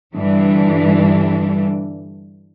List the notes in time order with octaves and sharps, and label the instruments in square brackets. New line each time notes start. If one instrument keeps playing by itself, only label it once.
[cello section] G2 D3 E3 G3 D4